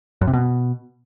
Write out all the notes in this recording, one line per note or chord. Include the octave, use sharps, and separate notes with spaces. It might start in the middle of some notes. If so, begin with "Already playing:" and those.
F#2
C3
B2